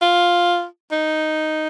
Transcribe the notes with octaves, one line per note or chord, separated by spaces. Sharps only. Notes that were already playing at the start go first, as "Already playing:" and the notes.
F4
D#4